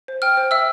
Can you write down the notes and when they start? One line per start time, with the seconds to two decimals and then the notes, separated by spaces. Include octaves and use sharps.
0.08 C5
0.22 G5 F6
0.37 C5
0.51 E5 E6